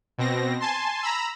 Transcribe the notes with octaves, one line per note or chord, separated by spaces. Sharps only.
B2 C4 A#6
G#5 A5 C6
A#5 B5 E6